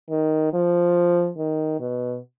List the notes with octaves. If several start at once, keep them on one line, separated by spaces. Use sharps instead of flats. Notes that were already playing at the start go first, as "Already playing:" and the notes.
D#3
F3
D#3
B2